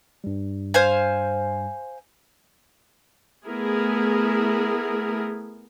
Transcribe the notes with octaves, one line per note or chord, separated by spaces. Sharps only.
G2 G3
C5 F5 G#5
A3 B3 E4 G#4 A#4